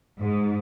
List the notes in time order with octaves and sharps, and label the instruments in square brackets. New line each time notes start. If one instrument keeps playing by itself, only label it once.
[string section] G#2